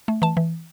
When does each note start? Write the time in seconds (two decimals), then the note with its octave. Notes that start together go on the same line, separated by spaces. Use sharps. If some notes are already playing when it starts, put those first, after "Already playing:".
0.08 A3
0.22 E3 A5
0.37 E3